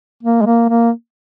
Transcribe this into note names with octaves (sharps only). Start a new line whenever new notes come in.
A#3
G#3
A#3
A#3